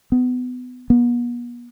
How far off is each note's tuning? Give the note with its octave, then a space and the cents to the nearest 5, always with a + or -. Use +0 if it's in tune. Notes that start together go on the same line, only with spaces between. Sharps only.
B3 +20
B3 -40